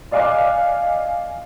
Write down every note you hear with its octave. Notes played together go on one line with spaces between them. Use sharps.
D5 D#5 F5 G#5 D6 F#6